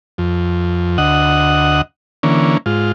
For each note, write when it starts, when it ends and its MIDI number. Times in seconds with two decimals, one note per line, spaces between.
0.18 0.98 41
0.98 1.81 38
0.98 1.81 75
0.98 1.81 78
2.23 2.58 50
2.23 2.58 52
2.23 2.58 58
2.23 2.58 61
2.66 2.92 44
2.66 2.92 65